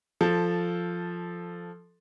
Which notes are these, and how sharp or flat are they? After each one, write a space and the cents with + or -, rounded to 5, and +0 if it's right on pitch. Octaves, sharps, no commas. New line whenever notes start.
F3 +0 A4 +0